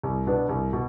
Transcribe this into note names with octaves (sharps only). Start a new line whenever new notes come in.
C2
B2 B3 D4
C2
B2